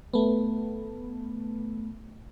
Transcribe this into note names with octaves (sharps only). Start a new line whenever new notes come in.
A3 B3